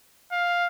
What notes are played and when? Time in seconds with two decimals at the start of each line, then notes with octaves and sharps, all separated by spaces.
0.32 F5